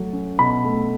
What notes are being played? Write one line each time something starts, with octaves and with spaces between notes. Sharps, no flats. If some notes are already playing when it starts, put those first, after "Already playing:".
Already playing: F#3 A3
C#4
B2 B5
A3